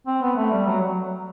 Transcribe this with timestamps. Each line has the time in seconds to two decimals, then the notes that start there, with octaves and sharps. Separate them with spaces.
0.07 C4
0.22 B3
0.37 A3
0.51 G3
0.66 F#3
0.81 F#3